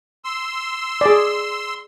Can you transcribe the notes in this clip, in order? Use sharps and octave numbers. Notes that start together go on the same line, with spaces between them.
C6 E6
G#4 D5